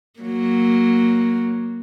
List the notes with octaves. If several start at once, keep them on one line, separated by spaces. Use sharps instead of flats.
F#3 A#3